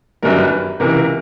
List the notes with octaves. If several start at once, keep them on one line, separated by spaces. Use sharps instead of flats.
G1 F#2 D#3 G3 A#4
B4
C#2 C3 E3 A#4
A#4